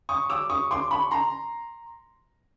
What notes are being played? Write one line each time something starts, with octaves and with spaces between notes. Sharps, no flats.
C#6 D#6
D6 E6
C#6 D#6
C6 D6
B5 C#6
A#5 C6